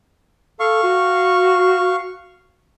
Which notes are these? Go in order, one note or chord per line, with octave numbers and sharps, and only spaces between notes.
A4 F5 C#6
F#4